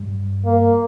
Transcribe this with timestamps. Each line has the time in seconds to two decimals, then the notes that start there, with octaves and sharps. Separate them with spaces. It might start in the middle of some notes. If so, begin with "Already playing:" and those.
Already playing: G2
0.45 A#3